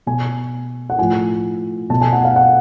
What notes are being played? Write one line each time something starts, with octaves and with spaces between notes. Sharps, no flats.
B2 G#5
F#5
A2 F3 G#5
B2 A5
G#5
F#5
F5
F#5